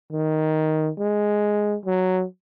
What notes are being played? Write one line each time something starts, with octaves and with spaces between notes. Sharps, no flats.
D#3
G#3
F#3